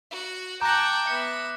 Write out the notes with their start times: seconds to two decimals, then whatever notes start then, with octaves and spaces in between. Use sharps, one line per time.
0.11 F#4
0.61 F#5 G5 A5 A#5 D6 F#6 A#6
1.07 B3 E5 C#7